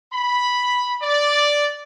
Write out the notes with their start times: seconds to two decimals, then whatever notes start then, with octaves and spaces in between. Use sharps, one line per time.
0.13 B5
1.02 D5